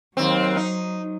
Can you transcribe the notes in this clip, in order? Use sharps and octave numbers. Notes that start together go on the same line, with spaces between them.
D#2 F#3 C4
D#4